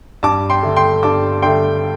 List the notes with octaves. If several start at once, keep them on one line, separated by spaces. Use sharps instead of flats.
G2 A5 D6
G5 C6
D3 A3
G5 C6
G2 A5 D6
D3 A3 G5 C6